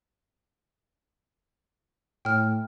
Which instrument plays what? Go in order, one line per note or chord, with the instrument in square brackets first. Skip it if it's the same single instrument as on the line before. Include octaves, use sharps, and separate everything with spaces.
[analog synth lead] A2 [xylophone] G5 F6